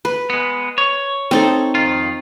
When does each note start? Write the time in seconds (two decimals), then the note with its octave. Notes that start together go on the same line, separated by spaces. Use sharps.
0.05 B4
0.30 G#3 B3
0.78 C#5
1.31 C4 D#4 A4
1.75 F2 D#3 F4